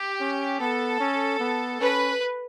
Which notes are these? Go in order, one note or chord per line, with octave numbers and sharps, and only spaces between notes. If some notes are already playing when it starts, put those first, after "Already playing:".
Already playing: G4
C#4
B3 A4
C#4
B3
C#4 B4